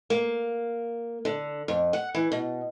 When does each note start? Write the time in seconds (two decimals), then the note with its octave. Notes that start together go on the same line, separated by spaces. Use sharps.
0.10 A#3
1.25 D3
1.68 F2
1.93 F#5
2.15 E3
2.32 B2